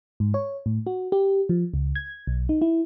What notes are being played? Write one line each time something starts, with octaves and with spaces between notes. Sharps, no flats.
G#2
C#5
A2
F#4
G4
F3
C#2
G#6
B1
D#4
E4